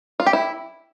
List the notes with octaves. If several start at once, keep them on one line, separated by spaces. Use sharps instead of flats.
F4
G4
E4